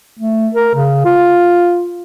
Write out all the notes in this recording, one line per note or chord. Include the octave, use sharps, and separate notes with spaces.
A3
A#4
C#3
F4